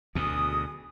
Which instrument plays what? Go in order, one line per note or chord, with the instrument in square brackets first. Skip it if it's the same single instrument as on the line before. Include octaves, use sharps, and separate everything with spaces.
[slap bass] D2 B2 [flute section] G#4 D#6